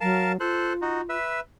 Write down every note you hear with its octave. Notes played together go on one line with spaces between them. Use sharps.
F#3 A#4 F5 A5
F4 A4 C5 F#6
D#4 F#4
B4 E5